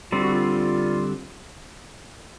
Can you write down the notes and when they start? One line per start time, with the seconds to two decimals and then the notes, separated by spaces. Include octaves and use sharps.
0.12 D3 G3 C4 F4
0.23 F#4
0.32 F4